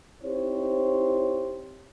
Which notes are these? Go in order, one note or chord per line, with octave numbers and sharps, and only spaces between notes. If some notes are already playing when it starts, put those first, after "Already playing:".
C4 D#4 E4 G4 C5 C#5